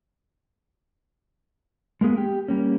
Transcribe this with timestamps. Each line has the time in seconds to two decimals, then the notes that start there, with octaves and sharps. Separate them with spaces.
2.01 G#3 A#3 B3 G#4
2.18 G4 G5
2.48 G3 A#3 C#4